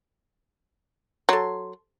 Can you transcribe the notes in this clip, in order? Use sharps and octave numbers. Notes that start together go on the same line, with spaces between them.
F#3 A4 C6